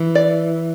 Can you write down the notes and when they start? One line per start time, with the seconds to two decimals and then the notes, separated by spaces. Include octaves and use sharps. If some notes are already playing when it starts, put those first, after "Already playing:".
Already playing: E3
0.15 D5